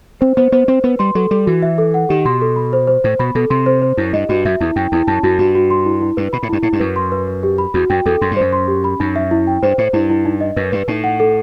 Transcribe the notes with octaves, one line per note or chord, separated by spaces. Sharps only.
C4 C5
B3 C5
B3 C5
C4 C5
B3 B4
G3 C6
F#3 A4
G3 A4
E3 F#4
E5
A4
F#5
D#3 G4
B2 C6
A4
B5
C5
C5
A2 C5
B2 B5
B2 A4
C3 C6
C5
C5
F#2 E4
G2 D#5
G2 F#4
F#2 E5
E2 E4
F#2 G5
E2 E4
F#2 A5
F#2 F#4
G2 F#4
F#4
C6
E4
E4
G2 B4
B2 B5
A2
G2 E4
A2 E4
G2
F#2 B4
C6
B4
B4
G4
B5
E2 F#4
F#2 G5
E2 A4
F#2 C6
G2
F#2 C5
C6
G4
B5
F#2 D#4
E5
E4
G5
G2 C5
A2 C5
G2 E4
E4
D#4
D#5
F#2 B4
G2 B4
A2 D#4
F#5
A4